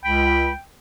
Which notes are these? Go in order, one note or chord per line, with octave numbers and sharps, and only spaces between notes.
C#2 G5 B5